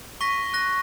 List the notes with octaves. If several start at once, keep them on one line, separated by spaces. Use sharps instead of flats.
C#6 A#6 B6 G7
F#6 A#6